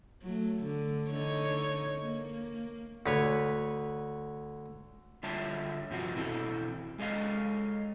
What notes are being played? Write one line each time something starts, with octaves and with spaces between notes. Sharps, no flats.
F#3 A3
D3
D3 D#4 C#5
A#3
D2 B4 C#5
D3 G3 F4 C#5 E5 A5
G2 C3 F3 C4 F#4
B2 E3 C4 A4
G#3 A4 C#5 D#5 F5